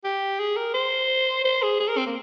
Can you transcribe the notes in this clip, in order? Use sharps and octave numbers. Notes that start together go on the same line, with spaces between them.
G4
G#4
A#4
C5
C5
G#4
G#4
A#4
C4
A#3